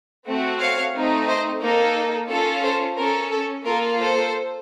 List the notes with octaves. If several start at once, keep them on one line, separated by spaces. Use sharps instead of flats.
A3 C4 F#4
C#5 F5
A3 C4 D#4
C5 D#5
A#3 D#4 A4 A#4
C#4 F4 A4
A4 C5
C#4 A4 A#4
A4
A#3 F4 A4 A#4
A4 C5